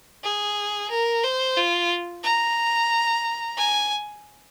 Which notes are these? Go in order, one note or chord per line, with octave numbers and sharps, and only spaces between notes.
G#4
A#4
C5
F4
A#5
G#5